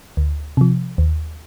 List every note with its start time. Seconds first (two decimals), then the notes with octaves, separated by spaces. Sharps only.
0.17 D2
0.57 C3 F3
0.98 D#2